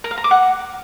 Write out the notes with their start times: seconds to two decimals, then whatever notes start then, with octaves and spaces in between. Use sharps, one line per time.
0.04 A#4
0.11 F5
0.18 A#5
0.24 D6
0.31 F#5